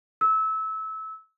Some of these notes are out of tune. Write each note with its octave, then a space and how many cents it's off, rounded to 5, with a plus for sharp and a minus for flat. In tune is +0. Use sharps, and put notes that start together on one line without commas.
E6 -25